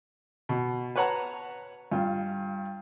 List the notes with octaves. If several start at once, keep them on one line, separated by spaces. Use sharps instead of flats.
B2
B4 C#5 F#5 A5 A#5
G2 F4